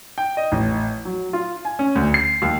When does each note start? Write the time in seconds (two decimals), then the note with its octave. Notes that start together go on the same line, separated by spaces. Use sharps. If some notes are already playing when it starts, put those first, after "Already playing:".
0.18 G5
0.37 D#5
0.52 A1
1.05 F#3
1.33 F4
1.65 G#5
1.79 C#4
1.95 D2
2.14 C7
2.42 D#2